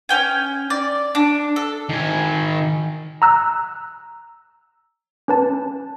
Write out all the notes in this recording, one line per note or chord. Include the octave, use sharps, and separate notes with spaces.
C#4 G5 G#5
D5
D4
A4
D#3 G#5
A#5 E6 F#6
C#4 B4 A5